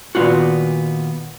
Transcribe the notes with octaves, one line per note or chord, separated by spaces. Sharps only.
A#2 D#3 B3 C4 F4 F#4